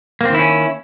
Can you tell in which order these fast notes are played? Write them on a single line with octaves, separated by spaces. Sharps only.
A#3 C4 D#3 E4 C#4